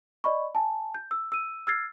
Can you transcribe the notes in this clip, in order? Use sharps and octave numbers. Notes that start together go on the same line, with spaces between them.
D5 D#5 B5 C#6
G#5 A5
G6
E6
E6 D#7
E6 F6 G#6 A6 C7